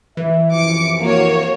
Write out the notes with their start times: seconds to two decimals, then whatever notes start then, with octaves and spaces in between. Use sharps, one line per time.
0.17 E3 E5
0.52 F#2 C3 F3 D6 C#7
1.00 A#3 F#4 C#5